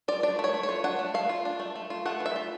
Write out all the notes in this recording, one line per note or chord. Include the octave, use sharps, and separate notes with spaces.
F4 D5
D4 D5
A3
C#5
A3
C#5
F4
D4 F#5
A3
A3 F5
F4
D4
A3
A3
F4
A3 F#5
E3
E5
F4